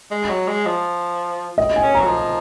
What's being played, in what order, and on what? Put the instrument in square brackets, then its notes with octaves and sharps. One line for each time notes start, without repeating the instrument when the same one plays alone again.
[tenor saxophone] G#3
F#3
G#3
F3
[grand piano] D#5
G#5
[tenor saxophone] C#4
[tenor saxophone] F#3 [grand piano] A#5
[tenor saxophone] F3